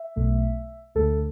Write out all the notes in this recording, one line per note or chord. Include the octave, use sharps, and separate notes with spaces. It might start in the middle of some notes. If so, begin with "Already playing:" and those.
Already playing: E5
B1 B2 A3
D2 D3 A3 A4